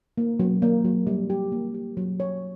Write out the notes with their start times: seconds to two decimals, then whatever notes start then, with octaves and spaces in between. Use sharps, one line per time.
0.18 A#3
0.39 F#3
0.62 A#3
0.85 F#3
1.07 G3
1.30 G4
1.52 A#3
1.74 G4
1.97 F#3
2.20 C#5